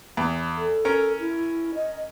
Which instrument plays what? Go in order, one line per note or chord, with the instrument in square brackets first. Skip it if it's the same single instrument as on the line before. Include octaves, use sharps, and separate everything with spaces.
[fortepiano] E2
[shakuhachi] A4
[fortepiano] C#4 A#4
[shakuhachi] E4
D#5